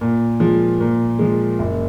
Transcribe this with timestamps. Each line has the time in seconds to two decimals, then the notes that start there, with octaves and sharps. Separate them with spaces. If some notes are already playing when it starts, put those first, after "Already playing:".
0.01 A#2
0.40 F3 G#3
0.80 A#2
1.19 F3 G#3
1.59 F#1